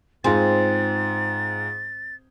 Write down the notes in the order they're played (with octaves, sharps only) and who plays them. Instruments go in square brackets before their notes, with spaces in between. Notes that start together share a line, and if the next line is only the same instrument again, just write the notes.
[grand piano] G#2 F4 G#4 [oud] C4 [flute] A6